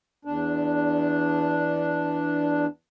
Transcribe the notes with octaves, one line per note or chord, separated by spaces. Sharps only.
E2 D4